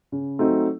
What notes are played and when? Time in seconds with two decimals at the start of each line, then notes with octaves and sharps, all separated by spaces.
0.12 C#3
0.39 F#3 A3 C4 D#4